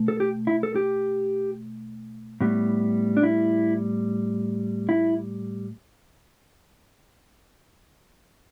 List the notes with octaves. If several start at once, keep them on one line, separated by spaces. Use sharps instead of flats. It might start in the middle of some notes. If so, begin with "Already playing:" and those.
Already playing: B2 A3
A4
G4
E4
A4
G4
A2 G3 B3
D4
E4
E4